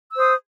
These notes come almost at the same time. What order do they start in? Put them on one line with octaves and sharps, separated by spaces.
E6 C5 D#6